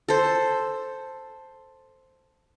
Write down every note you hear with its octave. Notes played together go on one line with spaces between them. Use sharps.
A4 C5